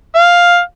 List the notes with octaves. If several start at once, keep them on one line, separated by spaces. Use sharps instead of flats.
F5